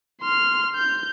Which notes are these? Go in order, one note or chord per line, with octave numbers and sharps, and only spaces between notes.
C6 F6
G6